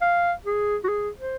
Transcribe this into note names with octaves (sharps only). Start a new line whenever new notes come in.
F5
G#4
F#4
G#4
C5